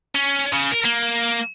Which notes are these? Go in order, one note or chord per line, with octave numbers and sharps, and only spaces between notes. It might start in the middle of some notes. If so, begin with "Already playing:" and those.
C#4
C#3
A#4
A#3